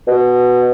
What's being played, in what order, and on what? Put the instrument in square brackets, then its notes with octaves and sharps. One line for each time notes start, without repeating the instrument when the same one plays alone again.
[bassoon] B2